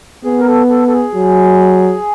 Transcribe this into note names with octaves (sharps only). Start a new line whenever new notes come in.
B3 G#4
A#4
A4
A4
A4
G#4
F#3